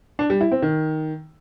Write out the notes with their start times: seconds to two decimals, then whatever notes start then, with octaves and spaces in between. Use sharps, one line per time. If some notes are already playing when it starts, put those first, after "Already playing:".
0.19 D4
0.30 G3
0.41 E4
0.52 C4
0.62 D#3